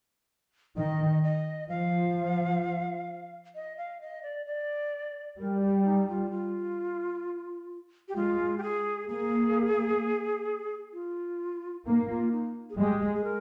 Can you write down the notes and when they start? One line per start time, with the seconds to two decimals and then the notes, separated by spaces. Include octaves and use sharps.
0.77 D#3 D#5
1.24 D#5
1.69 F3 F5
3.55 D#5
3.77 F5
4.01 D#5
4.23 D5
4.46 D5
5.39 G3 A#4
5.62 G4
5.85 D#4
6.09 F4
6.31 F4
8.08 G4
8.16 G#3 F4
8.58 G4
8.63 G#4
9.08 A#3 G#4
10.93 F4
11.86 A#3 D#4
12.09 F4
12.31 D#4
12.70 G#4
12.78 G#3 G4
13.01 G#4
13.15 G#4
13.24 A#4